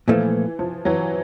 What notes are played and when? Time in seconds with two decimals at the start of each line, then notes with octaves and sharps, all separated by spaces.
0.08 A#2 E3 F3 A3
0.59 F3
0.85 E3 F#3